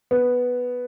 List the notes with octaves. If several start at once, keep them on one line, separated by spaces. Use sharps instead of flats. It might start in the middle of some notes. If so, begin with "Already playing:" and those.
B3